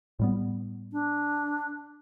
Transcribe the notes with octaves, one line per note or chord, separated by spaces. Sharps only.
A2 G3 B3
D4